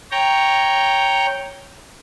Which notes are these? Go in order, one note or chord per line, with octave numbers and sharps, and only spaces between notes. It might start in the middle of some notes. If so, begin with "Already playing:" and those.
C#5 G5 A#5